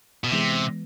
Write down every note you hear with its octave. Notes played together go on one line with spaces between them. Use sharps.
B2
C3 E3 G#3 B3